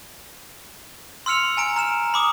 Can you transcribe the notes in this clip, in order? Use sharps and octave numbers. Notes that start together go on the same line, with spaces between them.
C6 E6 F6 C#7 F7
G#5 A#5 D7
A#5 F6 E7
B5 D6 D#6